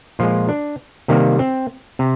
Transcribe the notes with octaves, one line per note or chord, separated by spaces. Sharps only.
A#2 F3 G#3 F4
D4
C3 D#3 G3 A#3
C4
C3